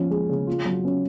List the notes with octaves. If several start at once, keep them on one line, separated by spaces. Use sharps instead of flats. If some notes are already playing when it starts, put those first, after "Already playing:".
Already playing: F3 C#4
G#3
C#3
F4
F#3
C#4